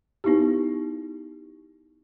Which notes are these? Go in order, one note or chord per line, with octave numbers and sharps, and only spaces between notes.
B3 D#4 E4 G4